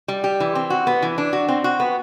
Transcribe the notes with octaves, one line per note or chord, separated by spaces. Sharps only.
G3
G4
E3
C4
F#4
B3
E3
D4
F#4
C4
F#4
B3